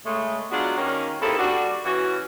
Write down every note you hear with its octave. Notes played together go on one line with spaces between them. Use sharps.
C#3 G#3 A3
F#3 G#3 B3 D4 F4 F#4
D#3 A#3 C#4
D#2 A#3 C4 E4 G#4 A4
G3 D4 F#4
E3 C#4 F#4